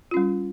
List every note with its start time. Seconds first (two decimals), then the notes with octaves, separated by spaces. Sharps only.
0.11 F4
0.14 C#4
0.17 G3